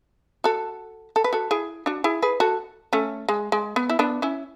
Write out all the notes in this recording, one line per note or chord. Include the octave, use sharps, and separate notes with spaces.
F#4 A4
A4
B4
F#4 A4
E4 G#4
D4 F#4
E4 G#4
G#4 B4
F#4 A4
A3 C#4
G#3
G#3
B3
E4
B3 D4
C#4 E4